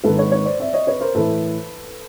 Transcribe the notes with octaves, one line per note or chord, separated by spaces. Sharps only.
G#2 D#3 A4 B4
B4 C#5
B4 C#5
C5 D5
D5 E5
C#5 D#5
B4 C#5
A#4 C5
A2 E3 A4 B4